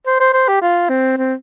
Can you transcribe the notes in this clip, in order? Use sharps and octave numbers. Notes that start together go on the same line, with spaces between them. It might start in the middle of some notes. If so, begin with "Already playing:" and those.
C5
C5
C5
G4
F4
C4
C4